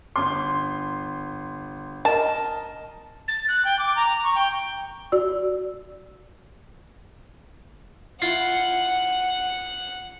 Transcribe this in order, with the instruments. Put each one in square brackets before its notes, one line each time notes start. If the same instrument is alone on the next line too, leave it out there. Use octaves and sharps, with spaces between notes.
[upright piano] G1 C6
[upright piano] A#4 D#5 [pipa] A5
[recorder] A6
F#6
G5
D6
A#5
C#6
G5
[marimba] F#4 D5 E6
[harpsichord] E4 F4 [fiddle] F#5 [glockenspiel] C7